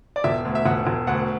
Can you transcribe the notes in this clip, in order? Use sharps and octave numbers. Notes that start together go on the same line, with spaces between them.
D5
E1 E5
D2
E5
E1 F#5
E1
D2 F#5